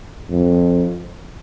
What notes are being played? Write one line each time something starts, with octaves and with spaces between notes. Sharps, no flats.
F2